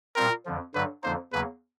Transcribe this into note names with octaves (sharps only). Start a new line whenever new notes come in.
A#2 G3 C4 F4 A#4
F2 D3 F3
G2 D3 F#3 B4
F2 D3 F3 A#3 D#4 C5
E2 C#3 F#3 A#3 B4